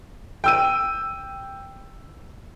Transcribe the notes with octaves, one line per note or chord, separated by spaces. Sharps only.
G5 E6 D#7